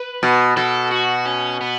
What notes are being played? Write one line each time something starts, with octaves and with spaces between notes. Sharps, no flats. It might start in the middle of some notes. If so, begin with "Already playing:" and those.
Already playing: B4
B2
B2 A4
F#4
C#4
B3